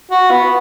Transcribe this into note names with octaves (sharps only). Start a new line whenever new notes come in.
F#4
B3